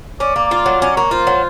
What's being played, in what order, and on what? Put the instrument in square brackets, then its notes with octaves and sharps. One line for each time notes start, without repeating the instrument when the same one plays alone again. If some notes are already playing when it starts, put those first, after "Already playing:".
[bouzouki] C#4 [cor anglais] D5
[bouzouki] A#3
F4
F#3
[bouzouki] C#4 [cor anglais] D5
[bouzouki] A#3 [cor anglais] C#5
[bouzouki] F4 [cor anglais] C5
[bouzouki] F#3